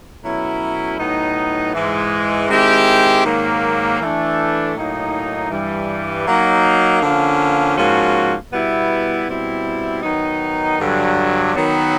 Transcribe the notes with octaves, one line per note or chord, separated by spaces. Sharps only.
B2 F#3 A3 C#4 E4
A2 F#3 B3 D#4
G#2 E3 G#3
D#3 G#3 C4 E4 G4
G#2 D#3 F#3 A#3
E3 A3 D4
A2 F#3 A#3 D#4
G2 E3 G3
F#3 A#3 D#4
D3 F3 A#3 C#4
G#2 F3 A#3 C#4 F#4
B2 G3 B3 E4
B2 G3 C4 E4
D#3 F#3 B3 D#4
G2 D3 F#3
D#3 F#3 B3